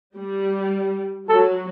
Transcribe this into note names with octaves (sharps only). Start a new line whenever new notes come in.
G3
F#3 A4